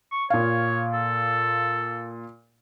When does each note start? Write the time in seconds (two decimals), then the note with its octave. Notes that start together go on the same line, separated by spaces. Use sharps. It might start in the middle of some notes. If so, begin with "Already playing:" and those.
0.12 C#6
0.30 A#2 C#5 F5
0.93 A4